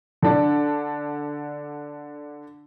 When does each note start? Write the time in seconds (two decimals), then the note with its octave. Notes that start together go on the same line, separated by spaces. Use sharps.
0.22 D3 D4